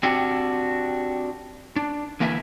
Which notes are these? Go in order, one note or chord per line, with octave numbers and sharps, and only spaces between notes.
C4 D4 F#4 G4 F#5
D4
D3 E3 A#3 E4 B4 E5